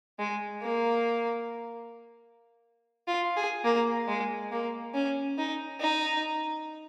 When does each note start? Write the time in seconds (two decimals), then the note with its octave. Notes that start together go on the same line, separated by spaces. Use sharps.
0.19 G#3
0.62 A#3
3.08 F4
3.36 G#4
3.64 A#3
4.08 G#3
4.52 A#3
4.94 C#4
5.38 D#4
5.80 D#4